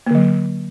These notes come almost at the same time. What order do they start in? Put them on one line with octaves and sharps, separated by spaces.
A#3 D3 F#3